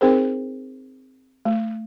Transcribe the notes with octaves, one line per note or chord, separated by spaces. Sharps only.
C4 D#4 G#4 A#4 C5
A3